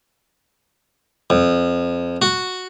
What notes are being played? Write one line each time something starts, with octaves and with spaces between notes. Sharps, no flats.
F2
F#4